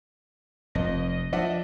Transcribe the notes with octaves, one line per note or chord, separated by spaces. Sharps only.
F1 F2 D#5
F3 D4 D#5 E5 F#5